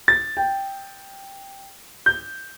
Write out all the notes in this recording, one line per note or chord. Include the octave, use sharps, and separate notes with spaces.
A6
G5
G6